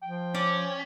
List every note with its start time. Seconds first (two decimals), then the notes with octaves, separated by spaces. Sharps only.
0.02 F3 G5
0.34 C#4 D5